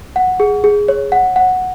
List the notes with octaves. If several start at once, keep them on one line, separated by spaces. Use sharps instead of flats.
F#5
G#4
G#4
C#5
F#5
F#5